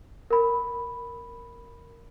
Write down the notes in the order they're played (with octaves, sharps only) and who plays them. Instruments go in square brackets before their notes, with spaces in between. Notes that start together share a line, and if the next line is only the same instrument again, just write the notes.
[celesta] A#4 B5